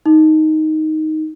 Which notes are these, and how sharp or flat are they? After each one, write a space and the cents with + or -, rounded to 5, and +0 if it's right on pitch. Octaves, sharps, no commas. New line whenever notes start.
D#4 +5